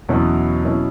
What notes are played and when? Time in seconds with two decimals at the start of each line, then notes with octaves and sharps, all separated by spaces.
0.09 E2 B2 F#3 C#4 E4
0.64 B2 F#3 C#4 E4